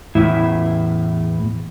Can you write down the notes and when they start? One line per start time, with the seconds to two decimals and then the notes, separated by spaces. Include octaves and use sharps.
0.15 E2 A2 E4 E5